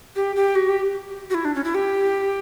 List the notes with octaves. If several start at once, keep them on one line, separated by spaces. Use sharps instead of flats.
G4
G4
F#4
G4
F#4
E4
D4
C#4
E4
G4